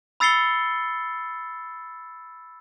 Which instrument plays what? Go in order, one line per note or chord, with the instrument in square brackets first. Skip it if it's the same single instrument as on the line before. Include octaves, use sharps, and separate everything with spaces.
[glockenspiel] B5 E6 A6 C7 C#7 G7